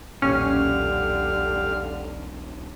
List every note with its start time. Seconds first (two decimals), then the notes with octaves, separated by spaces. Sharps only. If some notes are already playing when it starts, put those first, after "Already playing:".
0.22 B1 E2 A#2 D3 C#4 G4 F5 F6